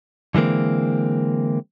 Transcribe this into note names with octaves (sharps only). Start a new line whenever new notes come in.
D3 E3 G#3 A#3 C4